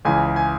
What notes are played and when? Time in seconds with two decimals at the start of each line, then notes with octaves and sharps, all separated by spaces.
0.05 C#2 C#3 E3 G#5
0.36 G#5